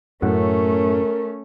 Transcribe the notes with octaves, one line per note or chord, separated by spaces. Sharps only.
F#2 A2 A3 C#4 A#4 F#5